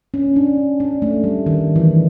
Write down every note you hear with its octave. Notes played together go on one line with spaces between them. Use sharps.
C#4
D4
D4
A3
G3
D#3
E3